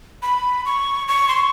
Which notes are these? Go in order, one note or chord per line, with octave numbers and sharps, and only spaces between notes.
B5
C#6
C#6
C6
C#6